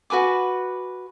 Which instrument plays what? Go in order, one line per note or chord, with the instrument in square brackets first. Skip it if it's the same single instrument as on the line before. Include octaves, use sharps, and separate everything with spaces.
[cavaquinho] F#4 B4 G#5 D6